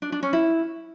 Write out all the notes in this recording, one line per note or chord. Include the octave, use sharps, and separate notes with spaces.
D4
D4
C#4
E4